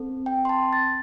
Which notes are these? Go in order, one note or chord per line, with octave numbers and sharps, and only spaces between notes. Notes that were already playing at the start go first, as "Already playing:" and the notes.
Already playing: C4 A4
G5
C6
A5
A6